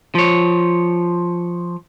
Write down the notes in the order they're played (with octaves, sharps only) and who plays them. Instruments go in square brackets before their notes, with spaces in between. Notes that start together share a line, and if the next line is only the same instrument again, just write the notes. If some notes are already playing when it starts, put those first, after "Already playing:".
[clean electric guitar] F3 C#5